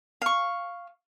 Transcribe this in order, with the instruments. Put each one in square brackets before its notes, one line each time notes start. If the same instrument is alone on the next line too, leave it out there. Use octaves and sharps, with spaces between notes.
[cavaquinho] F5 C#6